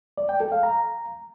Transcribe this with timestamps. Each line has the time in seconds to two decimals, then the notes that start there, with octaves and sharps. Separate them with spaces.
0.18 D5
0.29 G5
0.40 A4
0.52 F5
0.63 A#5